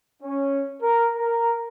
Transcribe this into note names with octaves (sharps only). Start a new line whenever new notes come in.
C#4
A#4
A#4